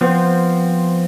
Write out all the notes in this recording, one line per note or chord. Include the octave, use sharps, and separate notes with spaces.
F3 B3 C4